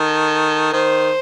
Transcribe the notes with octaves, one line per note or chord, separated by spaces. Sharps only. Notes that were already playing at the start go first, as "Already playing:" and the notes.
Already playing: D#3 A4
D#3 C5